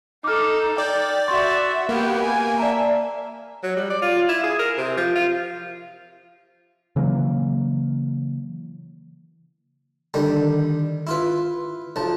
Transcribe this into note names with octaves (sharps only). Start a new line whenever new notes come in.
D#4 A4 D6 F6
D5 G5
F#4 E5 C6 C#6 A6
A#3 B3 G4
G#5
D5 E5 A5 A#5
F#3
G3
D5
F4
E4
G#4
A#4
C3
F3
F4
C#3 E3 F#3 A#3
D3 D#3 G3
E4 F4 B4
B1 F3 A5